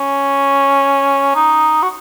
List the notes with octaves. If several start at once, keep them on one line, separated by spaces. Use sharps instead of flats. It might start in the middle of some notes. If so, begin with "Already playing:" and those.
Already playing: C#4
D#4
F#4